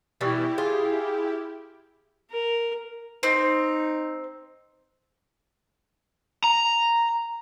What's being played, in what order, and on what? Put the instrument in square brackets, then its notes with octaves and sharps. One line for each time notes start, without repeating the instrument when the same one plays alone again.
[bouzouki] B2 E3 G3 [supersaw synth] E4 G4
[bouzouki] F4 [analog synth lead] G#4
[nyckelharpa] A#4
[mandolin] C4 [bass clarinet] D#4
[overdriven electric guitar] A#5